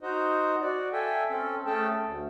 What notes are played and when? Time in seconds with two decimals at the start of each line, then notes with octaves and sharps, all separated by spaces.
0.01 D#4 F#4 C5 D#5
0.61 F#4 D5
0.93 A4 E5 G5 G#5
1.30 C4 C#4 A4
1.66 A3 C#4 G#4 A4 G5 A5
2.02 D2